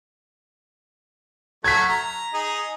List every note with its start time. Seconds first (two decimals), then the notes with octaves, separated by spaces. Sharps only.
1.64 F#3 A3 F#4 G#6 B6
1.88 A#5
2.34 D#4 G#4